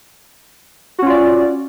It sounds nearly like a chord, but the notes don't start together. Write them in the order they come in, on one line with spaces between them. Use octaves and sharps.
F#4 C#4 F4 D5